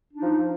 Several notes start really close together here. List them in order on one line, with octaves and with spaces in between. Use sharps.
D4 D#4 F3